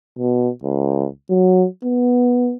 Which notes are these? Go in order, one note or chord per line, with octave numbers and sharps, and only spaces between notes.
B2
C#2
F#3
B3